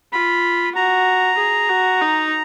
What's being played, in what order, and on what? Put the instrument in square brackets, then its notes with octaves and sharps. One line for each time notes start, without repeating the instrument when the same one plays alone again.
[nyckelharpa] F4 [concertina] B5
[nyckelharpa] F#4 [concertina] A#5
[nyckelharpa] G#4
F#4
D#4